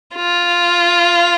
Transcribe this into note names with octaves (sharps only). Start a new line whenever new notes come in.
F4